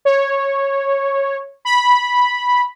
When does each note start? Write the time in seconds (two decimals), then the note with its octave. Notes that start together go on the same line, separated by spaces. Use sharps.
0.05 C#5
1.65 B5